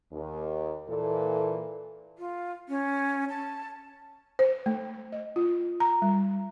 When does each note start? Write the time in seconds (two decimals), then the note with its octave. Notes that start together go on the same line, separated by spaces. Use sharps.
0.12 D#2
0.89 A#2 E3 A4
2.18 F4
2.69 C#4
3.29 A5
4.39 C5
4.66 A3
5.12 D#5
5.36 F4
5.80 A#5
6.02 G3